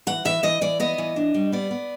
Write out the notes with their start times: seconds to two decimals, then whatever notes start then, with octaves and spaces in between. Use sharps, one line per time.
0.07 E3 F#5
0.25 E3 E5
0.43 E3 D#5
0.61 E3 D5
0.80 B3 D#5
0.98 E3
1.16 D4
1.34 G3
1.52 B3 D5
1.71 B3